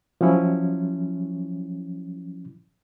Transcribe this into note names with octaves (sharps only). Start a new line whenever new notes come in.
F3 F#3 C#4 E4